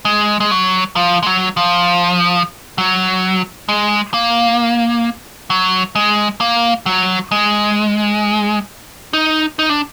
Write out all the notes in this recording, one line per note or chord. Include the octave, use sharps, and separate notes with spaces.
G#3
G#3
F#3
F3
G#3
F#3
F3
F#3
G#3
A#3
F#3
G#3
A#3
F#3
G#3
D#4
D#4
D4